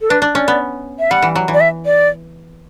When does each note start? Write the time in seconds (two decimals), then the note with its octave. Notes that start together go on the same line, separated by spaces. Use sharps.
0.01 A4
0.10 D4 B4
0.22 D4
0.35 C#4 D5
0.48 B3
0.99 E5
1.11 G3 F#5
1.22 E3
1.36 F#3
1.48 E3
1.54 D5
1.60 E5
1.86 D5